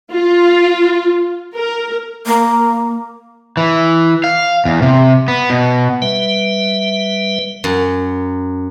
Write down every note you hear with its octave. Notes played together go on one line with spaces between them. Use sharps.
F4
A#4
A#3
E3
F5
E2
C3
B3
B2
G3 B4 E5
F#2